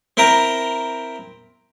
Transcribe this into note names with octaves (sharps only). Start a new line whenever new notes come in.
C4 E4 A#4 G5 A#5